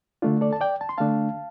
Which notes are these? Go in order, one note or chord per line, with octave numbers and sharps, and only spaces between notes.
D3 A3 D4 F4
A4 D5
A5
D5 G5
A5
C6
D3 A3 D4 F5 A5